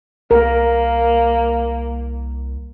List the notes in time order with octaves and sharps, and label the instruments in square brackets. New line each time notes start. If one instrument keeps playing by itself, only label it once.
[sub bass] C2 [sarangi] A#3 [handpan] A#4